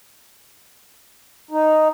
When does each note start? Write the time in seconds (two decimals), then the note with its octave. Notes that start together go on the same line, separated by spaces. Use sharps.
1.51 D#4